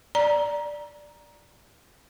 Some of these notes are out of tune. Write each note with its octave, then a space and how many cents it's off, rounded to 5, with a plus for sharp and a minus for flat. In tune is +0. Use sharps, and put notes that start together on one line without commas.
D5 +0 A#5 +15